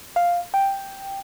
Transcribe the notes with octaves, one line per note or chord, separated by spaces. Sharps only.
F5
G5